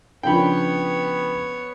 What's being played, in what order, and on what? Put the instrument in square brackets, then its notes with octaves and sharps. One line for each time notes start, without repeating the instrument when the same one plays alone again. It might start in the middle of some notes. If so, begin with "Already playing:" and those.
[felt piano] C#3 F3 D4 [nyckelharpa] B3 C#5 [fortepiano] G5 B5